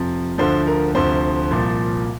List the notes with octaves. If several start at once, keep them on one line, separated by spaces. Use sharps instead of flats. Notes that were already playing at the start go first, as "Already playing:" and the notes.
Already playing: F2 C3 F3
D2 D3 F3 C5
A#4
D2 C3 F3 C5
C2 A#2 F3